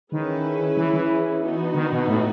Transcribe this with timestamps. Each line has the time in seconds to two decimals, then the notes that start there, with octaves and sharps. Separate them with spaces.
0.11 D#3 C#4 E4 G#4 B4
0.77 E3
0.93 E3
1.42 B3 D#4 F#4
1.75 D#3
1.92 B2
2.08 A2